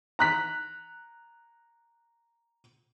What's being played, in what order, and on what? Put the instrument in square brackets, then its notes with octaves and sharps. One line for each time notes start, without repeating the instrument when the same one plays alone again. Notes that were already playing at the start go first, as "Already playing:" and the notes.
[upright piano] A#5 F#6 B6